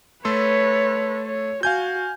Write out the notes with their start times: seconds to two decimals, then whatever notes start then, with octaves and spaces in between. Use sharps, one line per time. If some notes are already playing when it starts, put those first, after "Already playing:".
0.25 A3 A4 B4 C#5 C6
1.26 C#5
1.63 F#4 F5 G#5 G6